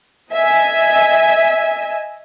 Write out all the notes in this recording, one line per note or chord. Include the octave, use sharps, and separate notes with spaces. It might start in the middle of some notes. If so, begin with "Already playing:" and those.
D#5 E5 G#5